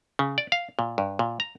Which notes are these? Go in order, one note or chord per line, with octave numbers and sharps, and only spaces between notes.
C#3
D5
F5
A#2
G2
A#2
A#5